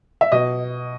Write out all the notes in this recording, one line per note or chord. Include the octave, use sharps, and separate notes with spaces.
E5
B2 D#5